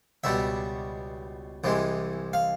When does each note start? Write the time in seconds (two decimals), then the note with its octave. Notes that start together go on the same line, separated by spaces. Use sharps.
0.24 C#2 B2 G3 E5
1.64 C2 C3 E3 G#3
2.33 F5